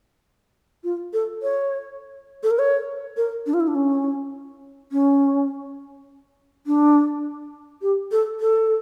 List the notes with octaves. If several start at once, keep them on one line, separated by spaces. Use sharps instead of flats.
F4
A4
C#5
A4
A#4
C#5
A#4
D4
F4
E4
D4
C#4
C#4
D4
G4
A4
A4